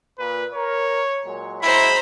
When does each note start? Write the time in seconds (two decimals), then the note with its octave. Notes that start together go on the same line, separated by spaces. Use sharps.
0.18 A#2 B4
0.54 A#4 C#5
1.24 A#2 F#3 G#3
1.62 F#3 G#3 E4 C5 A#5 B5